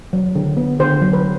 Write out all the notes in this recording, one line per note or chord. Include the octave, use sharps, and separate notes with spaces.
F#3
D3
B3
D3 C5
F#3
B4